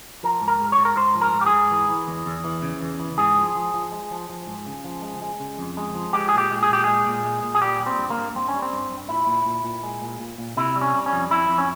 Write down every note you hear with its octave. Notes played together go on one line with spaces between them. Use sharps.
F3 A#4
G#2
A#4
G#3
C#5
G#2
A#4
G#2 C5
F3
A#4
G#2
G4
G#4
G#2
E3
E3
E2
E2
E3
C#3
E2
E3
G#2 G#4
F3
F3
F3
G#3
F3
F3
G#2
C#3
F3
G#3
G#3
C#3
F2
G#3
F3
G#3 G4
G#4
A#2
G4
G#3
G#4
A#2 G4
G#3 G#4
A#2
G#3
A#2
G#4
G3 G4
G3
C4
G2
A#3
G2
G2 C4
C#4
G3
C4
G2
G2
A#2 E4
A#2
A#2
A#2
G#3
A#2
A#2
A#2
C3 E4
G3
C#4
G3
C#4
F2
F2 E4
F2
C#4